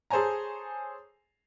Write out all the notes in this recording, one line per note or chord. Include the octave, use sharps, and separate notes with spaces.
G#4 A4 C5 C#5 G#5 A#5